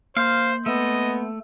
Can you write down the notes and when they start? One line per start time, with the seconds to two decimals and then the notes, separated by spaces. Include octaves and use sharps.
0.17 A#3 C5 F5 C6 G6
0.66 A3 B3 D#5